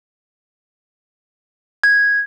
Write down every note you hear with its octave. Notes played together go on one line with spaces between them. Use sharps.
G#6